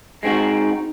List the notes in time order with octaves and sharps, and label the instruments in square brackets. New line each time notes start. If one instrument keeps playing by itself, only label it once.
[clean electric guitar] G#3 C4 F#4 [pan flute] D#4